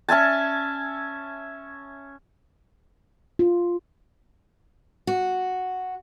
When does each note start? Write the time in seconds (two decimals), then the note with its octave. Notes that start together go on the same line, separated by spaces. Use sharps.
0.09 C#4 E5 G#5 A5
3.39 F4
5.07 F#4